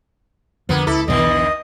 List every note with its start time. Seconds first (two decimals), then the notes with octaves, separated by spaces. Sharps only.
0.69 F2 D3 A#3 B3
0.87 C#2 E4 A4 B5
1.08 B1 E2 B2 D3 D#3 D#5